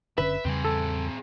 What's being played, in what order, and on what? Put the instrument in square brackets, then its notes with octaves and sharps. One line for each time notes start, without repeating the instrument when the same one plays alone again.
[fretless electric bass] F#1 D3 C#4 [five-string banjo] B4 [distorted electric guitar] E5
[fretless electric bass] E2 C#3 G3 [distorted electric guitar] C4 G#4
[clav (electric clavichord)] A4